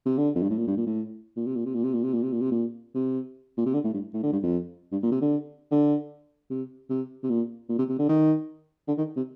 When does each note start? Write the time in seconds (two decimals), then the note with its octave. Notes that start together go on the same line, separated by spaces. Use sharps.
0.06 C3
0.18 D3
0.35 F2
0.42 G2
0.50 A2
0.58 A#2
0.68 G2
0.77 A#2
0.86 A2
1.36 A#2
1.46 C3
1.55 A#2
1.66 C3
1.74 A#2
1.84 C3
1.94 A#2
2.03 C3
2.13 A#2
2.23 C3
2.32 A#2
2.41 C3
2.51 A#2
2.95 C3
3.57 A#2
3.66 C3
3.74 D3
3.84 A2
3.94 G2
4.14 A2
4.23 D3
4.32 G2
4.43 F2
4.92 G2
5.03 A#2
5.12 C3
5.21 D3
5.71 D3
6.50 C3
6.90 C3
7.23 C3
7.30 A#2
7.69 A#2
7.79 C3
7.89 C3
7.99 D3
8.09 D#3
8.88 D3
8.98 D#3
9.17 C3